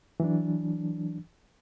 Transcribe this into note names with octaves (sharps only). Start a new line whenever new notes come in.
E3 F#3 D4